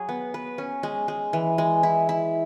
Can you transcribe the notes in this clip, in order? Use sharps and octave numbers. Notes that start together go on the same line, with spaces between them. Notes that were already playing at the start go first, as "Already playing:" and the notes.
Already playing: F#3 G#4
B3
B4
C#4
G#3
G#3
E3
G#3
E4
E4